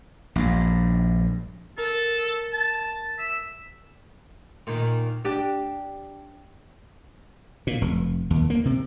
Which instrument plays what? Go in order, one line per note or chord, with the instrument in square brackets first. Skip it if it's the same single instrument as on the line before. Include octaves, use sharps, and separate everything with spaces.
[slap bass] A#1 G2
[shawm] A4 [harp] A#4
[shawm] A5
E5
[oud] A#2 D#3
D4 G4
[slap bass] A#2
F1
D#2
A#3
C3